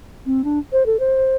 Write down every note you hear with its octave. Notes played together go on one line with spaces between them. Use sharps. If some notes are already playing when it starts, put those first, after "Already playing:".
C4
D4
C5
A4
C5